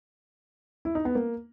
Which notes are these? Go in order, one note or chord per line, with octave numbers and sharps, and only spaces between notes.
E4
D#4
B3
A#3